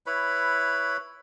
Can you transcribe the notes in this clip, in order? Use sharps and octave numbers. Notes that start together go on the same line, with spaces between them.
E4 B4 C#5 B5